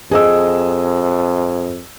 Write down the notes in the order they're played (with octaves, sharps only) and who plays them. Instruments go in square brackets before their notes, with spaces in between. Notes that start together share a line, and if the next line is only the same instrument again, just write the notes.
[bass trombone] F2 [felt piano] G#4 D#5 E6